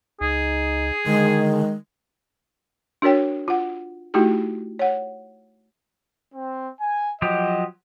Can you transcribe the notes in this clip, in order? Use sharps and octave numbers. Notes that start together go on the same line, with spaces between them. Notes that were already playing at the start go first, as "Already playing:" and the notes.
C#2 D#4 G#4
D3 D#3 G#3
D4 F#4 A#4 C#5 G5
F4 F#5
A3 D#4 E4 F#4 G4
C#5 F#5
C4
G#5
F3 F#3 G4 D#5